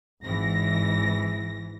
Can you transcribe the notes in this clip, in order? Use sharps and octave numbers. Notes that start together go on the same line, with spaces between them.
G#1 G#2 E3 A#6